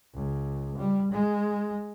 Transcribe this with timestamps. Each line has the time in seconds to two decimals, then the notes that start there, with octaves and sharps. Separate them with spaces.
0.14 C#2
0.77 G3
1.11 G#3